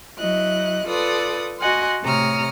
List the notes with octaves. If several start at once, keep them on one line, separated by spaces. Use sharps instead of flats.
F#3 E4 D#5 F#6
F4 A4 B4 D5 D#6
F#4 D#5 F#5 G#5 C6
A2 C3 C#5 A#5 D#6 F6